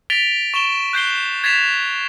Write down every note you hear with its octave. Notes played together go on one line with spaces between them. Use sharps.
A6 B6 D7 F7 G7
C#6 D7 E7 G7
F#6 G6 C7 G7
G#6 A6 B6 C7 E7 F7